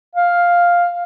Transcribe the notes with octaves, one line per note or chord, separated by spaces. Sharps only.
F5